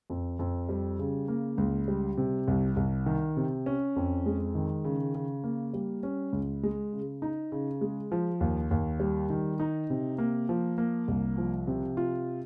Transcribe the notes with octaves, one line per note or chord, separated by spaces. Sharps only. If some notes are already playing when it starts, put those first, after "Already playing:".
F2
F2
G3
C#3
A#3
C#2
G3
C3
C2
C2
D#3
C3
C#4
F2
G#3
D#3
C#3
C#3
A#3
G3
C#4
C#2
G#3
C#3
D#4
C#3
G#3
F3
D#2
D#2
G3
D#3
D#4
C3
A#3
F3
A#3
C2
F3
C3
F4